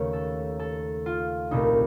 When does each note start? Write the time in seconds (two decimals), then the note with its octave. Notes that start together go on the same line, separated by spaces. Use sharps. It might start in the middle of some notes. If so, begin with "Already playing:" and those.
Already playing: D#2 C#3 A3 C#5
0.13 A4
0.59 A4
1.06 F4
1.51 C2 A#2 A3 D#4